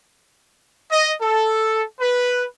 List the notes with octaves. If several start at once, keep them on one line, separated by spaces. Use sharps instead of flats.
D#5
A4
B4